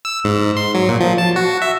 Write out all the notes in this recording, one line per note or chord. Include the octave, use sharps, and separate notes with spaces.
E6
G#2
C6
F#3
A#2
F3
A5
F#4
E5